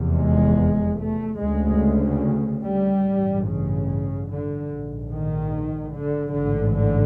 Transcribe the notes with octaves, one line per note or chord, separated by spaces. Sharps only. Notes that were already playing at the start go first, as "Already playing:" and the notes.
Already playing: F1 E2 C3
G#3
A3
D2 C#3 G#3
G3
A1 G2
C#3
D3
A#1 G#2
D#3
D3
A1 G#2 D3
D3